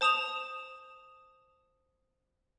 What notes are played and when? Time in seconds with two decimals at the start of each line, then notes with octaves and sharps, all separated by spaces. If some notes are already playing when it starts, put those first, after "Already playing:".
0.01 C5 A5 D#6 E7 F7